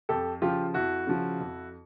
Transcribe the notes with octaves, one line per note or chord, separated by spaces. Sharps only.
F2 G4 A4
C#3 F3 F4 G4
F2 E4 F#4
C#3 F3
F2